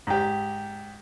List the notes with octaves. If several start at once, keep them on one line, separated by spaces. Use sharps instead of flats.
G#2 G4